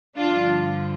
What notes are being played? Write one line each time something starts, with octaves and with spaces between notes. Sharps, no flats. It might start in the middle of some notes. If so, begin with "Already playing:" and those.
G2 D3 F3 D4 F4